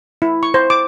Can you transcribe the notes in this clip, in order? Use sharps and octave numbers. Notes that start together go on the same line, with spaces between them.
E4
C#6
C5
D6